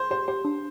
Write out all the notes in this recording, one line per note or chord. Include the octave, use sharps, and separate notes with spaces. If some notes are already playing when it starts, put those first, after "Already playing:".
Already playing: C5
G4 C5
G4 C5
D4